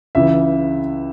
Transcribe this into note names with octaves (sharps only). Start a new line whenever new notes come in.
C#2 C#3 E3 E5